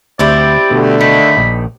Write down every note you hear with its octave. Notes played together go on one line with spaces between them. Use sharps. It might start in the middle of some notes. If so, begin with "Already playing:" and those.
D2 C4 E4 G4 D5
B2 D3 A3
D#3 B5
A#1